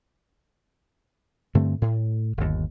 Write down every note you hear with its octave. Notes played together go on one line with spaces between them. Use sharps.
G2 D3 A3 C4
A2
G1 D#2